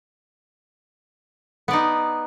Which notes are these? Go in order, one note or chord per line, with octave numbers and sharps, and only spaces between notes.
B3 D#4 D5